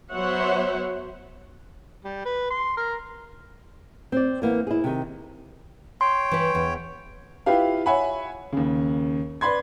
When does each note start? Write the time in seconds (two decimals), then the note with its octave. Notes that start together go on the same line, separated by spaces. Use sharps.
0.12 F#3 B3 C5 C#5 E5 F#5
2.05 G3
2.25 B4
2.51 C6
2.77 A#4
4.12 C4 D5
4.42 E3 A#3 B3
4.67 E4 G#4
4.84 C3 D#3
6.01 C#5 G5 C6
6.31 E3 B4
6.55 E2
7.46 E4 F4 G4 B4 F5
7.86 C#5 E5 F#5 G#5 B5
8.53 D#2 C#3
9.41 B4 D5 B5 C6 G#6